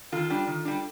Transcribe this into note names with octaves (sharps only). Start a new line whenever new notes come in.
D#3 F4 A4
G3 D4
D#3
G3 D4